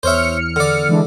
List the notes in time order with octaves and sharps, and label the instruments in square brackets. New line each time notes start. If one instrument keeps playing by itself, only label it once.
[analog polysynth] E2 F6 C#7 [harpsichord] C5 C#5 E5
[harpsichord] D3 D5
[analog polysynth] E3 G#3 D4